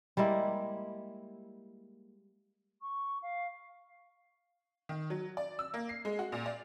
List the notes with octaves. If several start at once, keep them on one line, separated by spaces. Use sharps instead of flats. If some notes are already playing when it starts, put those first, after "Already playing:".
G3 G#3 A#3 E4
C#6
F5
D#3
F#3
D5
E6
A#3
C7
G#3
F#4
A#2
D5